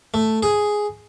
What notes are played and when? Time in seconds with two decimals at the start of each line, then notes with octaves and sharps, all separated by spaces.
0.14 A3
0.43 G#4